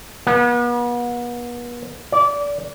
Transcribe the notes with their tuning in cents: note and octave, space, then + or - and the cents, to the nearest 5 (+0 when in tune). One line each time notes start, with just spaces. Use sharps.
B3 -40
D5 -25